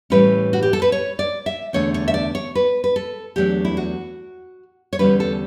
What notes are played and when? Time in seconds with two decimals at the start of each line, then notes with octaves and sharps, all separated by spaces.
0.10 A2 E3 G3 C#4 B4
0.53 F#4
0.62 G4
0.73 A4
0.82 B4
0.92 C#5
1.19 D5
1.46 E5
1.73 E2 D3 A3 D4 C#5
1.94 C#5
2.08 E5
2.14 D5
2.35 C#5
2.55 B4
2.84 B4
2.96 A4
3.36 E2 D3 F#3 A3 D4 G4
3.65 E4
3.77 F#4
4.93 C#5
4.99 E2 D3 G3 C#4 B4
5.20 A4